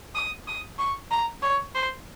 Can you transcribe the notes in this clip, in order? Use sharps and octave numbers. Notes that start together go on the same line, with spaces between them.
D#6
D#6
C#6
A#5
C#5
C5